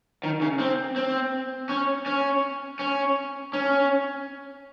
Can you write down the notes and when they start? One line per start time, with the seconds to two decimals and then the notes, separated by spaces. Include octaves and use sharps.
0.23 D#3
0.41 C#3
0.59 C4
0.96 C4
1.69 C#4
2.06 C#4
2.79 C#4
3.53 C#4